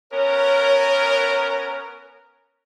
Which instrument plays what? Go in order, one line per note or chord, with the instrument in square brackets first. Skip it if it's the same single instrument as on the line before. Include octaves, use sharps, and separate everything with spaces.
[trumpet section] B3 C#4 A#4 [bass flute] C#5